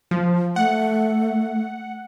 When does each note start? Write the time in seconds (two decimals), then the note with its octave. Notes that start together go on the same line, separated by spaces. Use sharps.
0.11 F3
0.56 A3 F#5